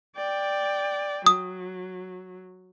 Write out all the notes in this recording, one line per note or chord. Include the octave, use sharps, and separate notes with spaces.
D5 G5
F#3 D#6